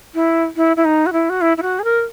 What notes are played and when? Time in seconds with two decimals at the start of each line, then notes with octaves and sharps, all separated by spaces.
0.15 E4
0.56 E4
0.77 E4
0.85 D#4
1.06 F#4
1.13 E4
1.30 F#4
1.41 E4
1.57 E4
1.62 F#4
1.79 G#4
1.84 A#4